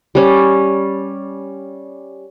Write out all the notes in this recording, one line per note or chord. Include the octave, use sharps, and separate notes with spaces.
G3 C#4